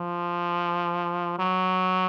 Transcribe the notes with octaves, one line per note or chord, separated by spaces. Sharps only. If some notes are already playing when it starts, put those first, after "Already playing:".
Already playing: F3
F#3